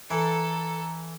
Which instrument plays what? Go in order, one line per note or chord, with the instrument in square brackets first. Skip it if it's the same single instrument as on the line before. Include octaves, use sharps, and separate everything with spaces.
[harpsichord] E3 [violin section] A4 [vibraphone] A#5